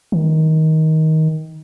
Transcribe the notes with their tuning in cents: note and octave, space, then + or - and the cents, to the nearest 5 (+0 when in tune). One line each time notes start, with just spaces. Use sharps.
D#3 +20